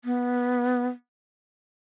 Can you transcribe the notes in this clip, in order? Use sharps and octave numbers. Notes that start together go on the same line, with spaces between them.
B3